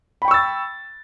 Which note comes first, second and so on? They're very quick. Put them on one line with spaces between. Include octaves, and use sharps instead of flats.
B5 G5 C#6 E6 A6